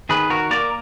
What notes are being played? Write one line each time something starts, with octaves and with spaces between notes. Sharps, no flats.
D#3 G#4 B4
F#4 A#4
A#3 A#4 D5